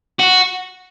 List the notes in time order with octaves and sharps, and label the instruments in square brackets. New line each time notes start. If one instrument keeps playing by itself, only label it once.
[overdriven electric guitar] F#4